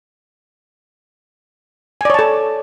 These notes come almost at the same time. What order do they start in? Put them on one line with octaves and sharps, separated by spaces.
G#5 D5 C#5 A5 A4